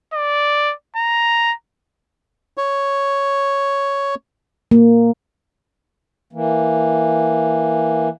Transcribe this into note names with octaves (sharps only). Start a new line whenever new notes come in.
D5
A#5
C#5
A#3
E3 A#3